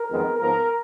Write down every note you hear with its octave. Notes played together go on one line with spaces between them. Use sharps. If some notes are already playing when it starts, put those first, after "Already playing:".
Already playing: A#4
F2 D#3 G#3 B3
G#2 F3 B3 A#4